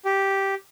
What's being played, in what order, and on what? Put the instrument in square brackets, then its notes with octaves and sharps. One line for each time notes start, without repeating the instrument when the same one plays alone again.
[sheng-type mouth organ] G4